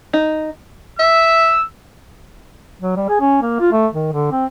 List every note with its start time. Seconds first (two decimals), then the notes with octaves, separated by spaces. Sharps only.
0.13 D#4
0.99 E5 E6
2.82 F#3
2.97 G3
3.09 G#4
3.21 C#4
3.42 A#3
3.60 F4
3.72 A3
3.92 D#3
4.12 D3
4.32 C4